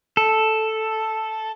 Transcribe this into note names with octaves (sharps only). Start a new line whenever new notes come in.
A4